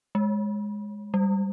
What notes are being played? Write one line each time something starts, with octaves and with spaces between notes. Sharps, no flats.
G#3
G3